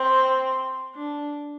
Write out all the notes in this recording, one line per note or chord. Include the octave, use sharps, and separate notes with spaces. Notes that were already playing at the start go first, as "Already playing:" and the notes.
Already playing: C4
D4